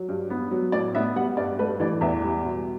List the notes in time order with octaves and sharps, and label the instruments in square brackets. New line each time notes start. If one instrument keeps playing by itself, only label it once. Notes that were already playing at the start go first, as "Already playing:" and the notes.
Already playing: [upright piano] F#3
G2
B3
F#3
A2 D5
B3 E5
G3 F#5
G2 D5
A3 B4
E3 D5
E2 E5
G3
B2